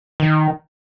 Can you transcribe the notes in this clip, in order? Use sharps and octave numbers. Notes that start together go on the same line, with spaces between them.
D#3